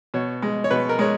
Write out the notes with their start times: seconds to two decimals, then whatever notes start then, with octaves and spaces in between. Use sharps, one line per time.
0.14 B2 C#5
0.42 G#3
0.64 C#5
0.71 B2 B4
0.89 A#4
0.99 G#3 C#5